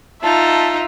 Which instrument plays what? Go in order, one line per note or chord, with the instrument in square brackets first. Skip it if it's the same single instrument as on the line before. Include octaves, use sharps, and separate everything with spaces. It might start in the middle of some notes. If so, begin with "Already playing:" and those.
[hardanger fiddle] D#4 [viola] F4 [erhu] E5 [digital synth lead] A5